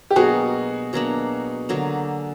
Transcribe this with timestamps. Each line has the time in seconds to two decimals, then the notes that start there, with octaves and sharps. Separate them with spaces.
0.11 G4
0.16 B2 F#3 A#3 D4 F#4 G#4
0.93 B2 F#3 A#3 D4
1.69 D3 F#3 A#3